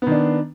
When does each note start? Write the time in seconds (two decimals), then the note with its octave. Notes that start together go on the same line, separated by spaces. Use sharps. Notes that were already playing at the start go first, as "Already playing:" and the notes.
0.02 B3
0.07 D#3
0.12 D4